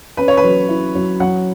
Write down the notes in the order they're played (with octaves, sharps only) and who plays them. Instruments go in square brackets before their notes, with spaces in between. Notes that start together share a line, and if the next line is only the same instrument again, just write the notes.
[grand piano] C#4 [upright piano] B4
[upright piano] C#5
B4
[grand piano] F#3
E4
F#3
[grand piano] F#3 [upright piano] F#5